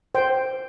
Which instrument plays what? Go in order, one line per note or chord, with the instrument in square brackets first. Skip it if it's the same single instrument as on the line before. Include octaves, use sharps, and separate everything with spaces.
[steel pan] C5 G5